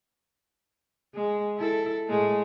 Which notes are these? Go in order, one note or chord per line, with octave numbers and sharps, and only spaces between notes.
G#3
E4 A4
A2 G#3 A3